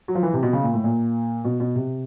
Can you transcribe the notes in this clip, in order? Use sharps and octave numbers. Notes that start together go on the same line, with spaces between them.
F#3
F3
E3
C3
B2
C#3
A#2
A2
A#2
B2
B2
C3